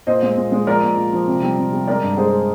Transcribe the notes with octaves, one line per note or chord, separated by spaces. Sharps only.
A#2 C5 D#5
G#3
A#2
G#3
F3 A#4 D5
A#2
F3
F3
C3
G3
C3
G3
G#3 A#4 D5
G2
G#3 G#4 C5